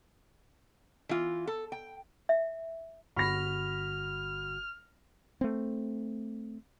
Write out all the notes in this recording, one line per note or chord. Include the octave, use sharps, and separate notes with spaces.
E3 F4
A4
G5
E5
G1 F#4 B5 F6 A#6
A3 C4